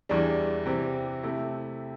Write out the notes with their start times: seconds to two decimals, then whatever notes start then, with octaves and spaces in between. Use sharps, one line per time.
0.09 E2 E3 G3 D4
0.66 C3 E3 C4 G4
1.23 C3 A3 E4 G4